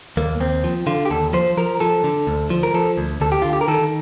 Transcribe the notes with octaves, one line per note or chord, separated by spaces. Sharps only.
D#2 A#3
D#2 C4
F3
D3 F4
G4
D#2 A4
F3 C5
F3 A#4
F3 A4
D3
D2
F3
A#4
F3 A4
D2
D2 A4
G4
D3 F4
G4
A#4
D#3 A4